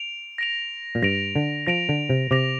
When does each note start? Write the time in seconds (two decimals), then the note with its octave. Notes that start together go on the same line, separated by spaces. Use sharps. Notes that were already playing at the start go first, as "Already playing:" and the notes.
Already playing: D7 F7
0.38 A#6 D7 F7
0.95 A#2
1.02 G2 A#6 D7 F7
1.36 D3
1.67 F3 A#6 D7 F7
1.89 D3
2.09 C3
2.31 C3 D6 A#6 F7